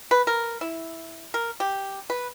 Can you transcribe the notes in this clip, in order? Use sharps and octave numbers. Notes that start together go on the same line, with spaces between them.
B4
A#4
E4
A#4
G4
B4